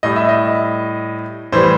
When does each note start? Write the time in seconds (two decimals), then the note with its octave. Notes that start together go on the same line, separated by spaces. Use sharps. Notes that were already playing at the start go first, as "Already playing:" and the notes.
0.03 A2 G3 D#5
0.16 E5
0.29 D#5
1.52 A2 E3 G3 C5